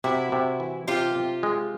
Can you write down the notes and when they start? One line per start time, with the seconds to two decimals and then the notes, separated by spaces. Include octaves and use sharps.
0.04 C3 E4 F#4
0.32 C3
0.60 E3
0.88 C3 F4 G4
1.15 C3
1.43 G#3